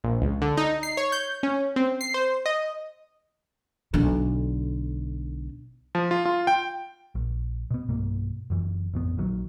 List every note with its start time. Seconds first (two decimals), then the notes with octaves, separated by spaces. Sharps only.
0.04 A#1
0.22 C#2
0.42 D3
0.57 D#4
0.83 C7
0.97 C#5
1.12 G6
1.43 C#4
1.76 C4
2.01 C7
2.14 C5
2.46 D#5
3.94 B1 D3
5.95 F3
6.11 F4
6.25 F4
6.47 G5
7.15 A#1
7.71 B2 B3
7.89 B1 G2 B2 A#3
8.50 F#1 F#2 E3
8.94 A1 F2 B3
9.18 A#1 A#2 D#3 F#3